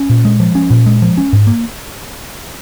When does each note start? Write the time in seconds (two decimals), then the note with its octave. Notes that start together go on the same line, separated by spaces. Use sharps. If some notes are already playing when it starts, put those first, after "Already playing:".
Already playing: C#4
0.10 A#2
0.25 G#3
0.40 F3
0.55 C#4
0.70 A#2
0.86 G#3
1.02 F3
1.18 C#4
1.33 G#2
1.47 A#3